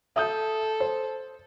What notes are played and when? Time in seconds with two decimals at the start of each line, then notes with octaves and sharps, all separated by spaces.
0.16 A4 E5 D#6 G6
0.80 C5